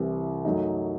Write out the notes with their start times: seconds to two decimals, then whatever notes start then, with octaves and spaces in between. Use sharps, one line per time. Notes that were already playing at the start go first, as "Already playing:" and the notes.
Already playing: C2 C3 E3
0.45 F#2 F#3 A3 D#4